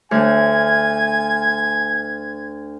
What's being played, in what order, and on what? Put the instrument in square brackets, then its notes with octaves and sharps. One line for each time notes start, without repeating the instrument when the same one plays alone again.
[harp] D2 [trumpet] G#5 [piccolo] G#6